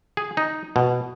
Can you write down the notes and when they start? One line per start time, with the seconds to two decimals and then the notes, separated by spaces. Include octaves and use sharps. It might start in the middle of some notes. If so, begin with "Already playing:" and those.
0.17 G#4
0.37 D#4
0.76 B2